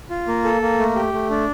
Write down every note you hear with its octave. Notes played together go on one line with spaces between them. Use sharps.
F4
A#3
A4
A#3
A3
G4
A3
D4